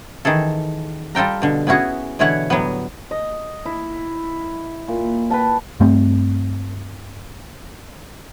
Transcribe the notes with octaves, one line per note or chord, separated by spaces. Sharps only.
D#3 E3 G#4 A4
G3 F4 A4 G5 A#5
B2 D3
B3 C#4 E4 F#4 G#4
B2 D3 E3 E4 C#5 F#5
A2 F#3 G3 B3
D#5
E4
A#2
B4 G5 A5
G2 A3 C4